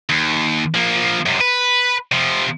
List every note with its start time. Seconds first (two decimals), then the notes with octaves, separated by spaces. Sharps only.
0.09 D#2
0.74 F3 A#3
1.26 F#2 C3
1.40 B4
2.12 C3 F3